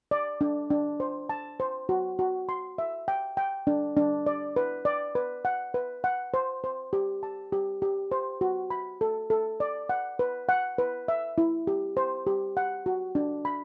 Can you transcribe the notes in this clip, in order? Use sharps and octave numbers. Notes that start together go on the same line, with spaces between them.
D5
D4
D4
C5
A5
C5
F#4
F#4
C6
E5
G5
G5
D4
D4
D5
B4
D5
B4
F#5
B4
F#5
C5
C5
G4
A5
G4
G4
C5
F#4
B5
A4
A4
D5
F#5
B4
F#5
B4
E5
E4
G4
C5
G4
F#5
F#4
D4
B5